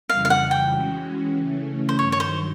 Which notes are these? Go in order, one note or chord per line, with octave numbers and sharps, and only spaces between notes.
F2 C#3 E3 G3 F5
F5
F#5
G5
E3 G#3 C#4 F#4
C#3 E3 A3 C#4
C5
G2 D#3 F#3 C#5
C#5
C5